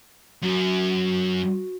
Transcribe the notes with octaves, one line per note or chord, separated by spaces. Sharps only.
F#2 F#4